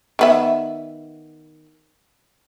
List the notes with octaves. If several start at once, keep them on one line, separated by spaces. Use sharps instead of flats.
D#3 B3 E5